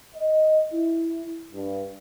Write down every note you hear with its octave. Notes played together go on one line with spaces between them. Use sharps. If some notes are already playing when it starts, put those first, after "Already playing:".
D#5
E4
G2